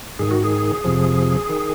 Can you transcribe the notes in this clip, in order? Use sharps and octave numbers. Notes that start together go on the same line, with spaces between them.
G#2 D#3 G#4
F#4
G#4
F2 C3 F3
D#3